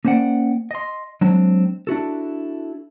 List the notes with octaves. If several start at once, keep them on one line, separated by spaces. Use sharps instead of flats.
A#3 C#4 C5 D5 F#5 G5
D#5 C6
F#3 G#3 C4 D4
D4 E4 F#4 A4